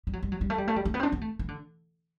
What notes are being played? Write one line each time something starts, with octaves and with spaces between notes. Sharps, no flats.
G3
F#3
G3
F#3
G3
A3
G3
A3
G3
A3
B3
C4
D4
B3
A3
E3
D3